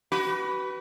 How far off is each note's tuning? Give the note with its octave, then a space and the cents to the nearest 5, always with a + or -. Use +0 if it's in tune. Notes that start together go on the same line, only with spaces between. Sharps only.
F#4 +45 B4 +0